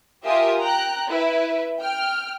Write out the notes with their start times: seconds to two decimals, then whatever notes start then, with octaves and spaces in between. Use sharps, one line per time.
0.25 F4 G4 A#4 E5 G#5 D#6
0.61 G5 A#5 F#6
1.09 E4 B4
1.80 G5 F6